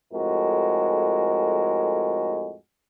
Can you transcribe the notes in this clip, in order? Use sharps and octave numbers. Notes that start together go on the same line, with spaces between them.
F2 A2 G#3 F#4 A#4